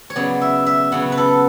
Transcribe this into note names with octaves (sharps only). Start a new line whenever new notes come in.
C#5
C#3 F#3 B3 D5
E5
E5
C#3 F#3 B3 F#5
B4
A4